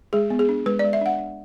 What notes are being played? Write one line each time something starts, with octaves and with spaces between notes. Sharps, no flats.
G#3 G#4
B3
G#4
D4
G#3 B4
G#3 D5
E5
D4 F#5
D4